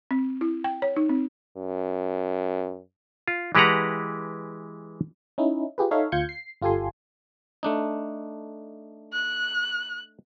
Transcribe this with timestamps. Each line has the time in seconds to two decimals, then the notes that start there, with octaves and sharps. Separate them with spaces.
0.11 C4
0.41 E4
0.64 G5
0.82 C#5
0.96 D#4
1.09 C4
1.57 F#2
3.28 F4
3.55 E3 G#3 G4 B4 F#5 A#5
5.38 C#4 D#4 E4
5.78 F4 G4 G#4 B4
5.91 D#4 A4 C#5 E5 F5
6.12 D2 F4 F5 G6 G#6 C#7
6.29 C7
6.62 G1 F4 G4 A4 G#5 C6
7.63 A3 D4 D#4
9.13 F#6